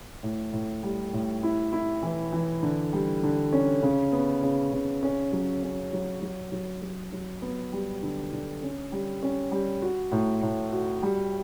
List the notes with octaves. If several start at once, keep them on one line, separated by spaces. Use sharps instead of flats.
A2
A2
G3
A2
E4
E4
E3
E3
D3
G3
D3
C#4
C#3
B3
C#3
C#3
C#4
F#3
C#4
F#3
F#3
F#3
F#3
F#3
B3
G3
D3
D3
C#4
G3
C#4
G3
F#4
A2
A2
F#4
G3